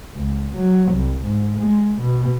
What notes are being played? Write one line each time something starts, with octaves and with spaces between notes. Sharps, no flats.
C#2
F#3
C2
G#2
G#3
B2